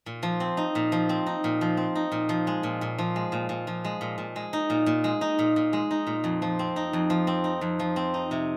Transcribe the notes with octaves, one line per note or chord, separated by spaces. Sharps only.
A#2
F3
C4
D#4
A#2
F3
C4
D#4
A#2
F3
C4
D#4
A#2
F3
G#3
A#2
A#2
F3
G#3
A#2
A#2
F3
G#3
A#2
A#2
G#3
D#4
A#2
A#2
G#3
D#4
A#2
A#2
G#3
D#4
A#2
F2
F3
C4
D#4
F2
F3
C4
D#4
F2
F3
C4
D#4
C3